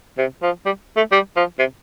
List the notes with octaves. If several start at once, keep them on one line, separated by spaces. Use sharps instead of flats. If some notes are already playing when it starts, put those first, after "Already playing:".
C3
F3
G3
A3
G3
F3
C3